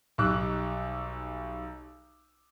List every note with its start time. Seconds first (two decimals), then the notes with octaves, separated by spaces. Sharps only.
0.18 B1 G3 D#4 D6 E6 F#6